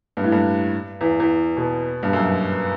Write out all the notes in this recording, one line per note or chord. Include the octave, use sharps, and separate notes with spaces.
G2
A2
G2
E2
E2
B2
G2
F#2